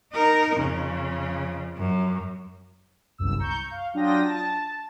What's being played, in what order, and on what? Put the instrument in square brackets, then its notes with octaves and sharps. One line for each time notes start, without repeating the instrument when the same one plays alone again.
[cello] D#4 A#4
F2 C#3
F#2
[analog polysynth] G1 C2 F#2 E6
A#5 C#6 G6
F5
F#3 D4 F4 G5 D#6 A#6
A5